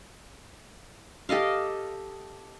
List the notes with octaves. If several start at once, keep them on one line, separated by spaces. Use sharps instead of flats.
G4 A4 D#5 F5